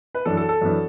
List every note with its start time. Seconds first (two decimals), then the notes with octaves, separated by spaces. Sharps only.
0.15 B4
0.25 F#2 E3 B3 D4 A4
0.37 A4
0.49 A4
0.61 F#2 E3 B3 D4